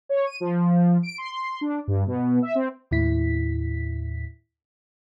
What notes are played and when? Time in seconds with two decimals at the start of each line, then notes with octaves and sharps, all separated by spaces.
0.09 C#5
0.27 D#7
0.40 F3
1.03 D7
1.18 C6
1.32 C6
1.61 D4
1.87 G2
2.07 B2
2.42 E5
2.55 C4
2.91 D#2 A2 E4 B6